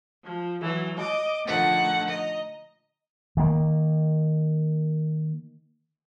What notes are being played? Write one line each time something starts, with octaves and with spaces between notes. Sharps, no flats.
F3
E3 F#3
D#5 D6
A#2 D3 F3 A3 D#4 F#5
D#5 A#5
D#3 A#3